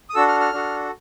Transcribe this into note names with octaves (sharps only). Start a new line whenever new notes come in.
D#6
D4 F#4 A4 E6
F6
F6
D4 F#4 A4